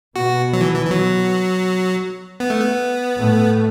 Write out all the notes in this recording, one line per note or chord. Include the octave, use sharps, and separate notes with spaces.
B2 B3 F#4
F#3
E3
E3
E3
F#3
B3
A3
B3
A2 A3